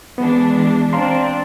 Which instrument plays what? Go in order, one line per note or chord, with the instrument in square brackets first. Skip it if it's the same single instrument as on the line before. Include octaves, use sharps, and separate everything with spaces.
[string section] E3 G#3 D4 [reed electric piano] B3
[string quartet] C4 D4 [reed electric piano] F5 A#5 C6